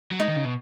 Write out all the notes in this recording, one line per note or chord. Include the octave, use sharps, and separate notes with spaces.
F#3
G#3 D#4
D#3
C#3
B2